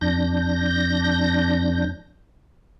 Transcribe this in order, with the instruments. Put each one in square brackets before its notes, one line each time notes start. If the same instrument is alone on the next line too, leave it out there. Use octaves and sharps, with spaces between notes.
[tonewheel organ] F2 D4 G6 A#6